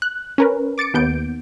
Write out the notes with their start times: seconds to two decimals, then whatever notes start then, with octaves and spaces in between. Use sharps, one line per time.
0.02 F#6
0.38 C#4 A#4 B4
0.78 D6 A6 C#7 D7
0.94 D#2 B3 G6 D7